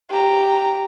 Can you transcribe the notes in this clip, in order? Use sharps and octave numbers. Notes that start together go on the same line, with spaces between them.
G4 A#5